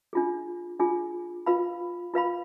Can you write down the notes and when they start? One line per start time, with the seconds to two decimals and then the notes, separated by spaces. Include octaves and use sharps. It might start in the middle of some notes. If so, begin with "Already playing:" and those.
0.13 D4 F4 G#4
0.80 D4 F4 G#4
1.46 F4 B4 F5 B5
2.14 F4 B4 F5 B5